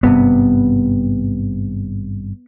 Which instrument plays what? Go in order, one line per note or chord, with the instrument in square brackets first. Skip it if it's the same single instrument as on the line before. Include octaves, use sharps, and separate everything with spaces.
[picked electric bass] G#1 G2 C3 [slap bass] B3